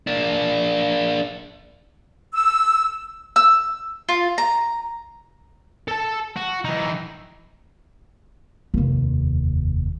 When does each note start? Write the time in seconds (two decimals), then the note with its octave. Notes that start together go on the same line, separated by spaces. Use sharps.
0.07 A#3 D4
2.34 E6
3.36 E6
4.09 F4
4.38 A#5
5.88 A4 A5
6.36 F#4
6.65 E3 D#4
8.74 F1 D#2